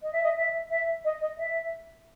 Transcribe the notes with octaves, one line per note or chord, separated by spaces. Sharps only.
D#5
E5
D#5
E5
E5
D#5
D#5
E5